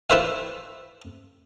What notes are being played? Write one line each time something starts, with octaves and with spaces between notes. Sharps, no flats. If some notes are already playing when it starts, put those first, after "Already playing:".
E4 F4 B4 C5 E5 F5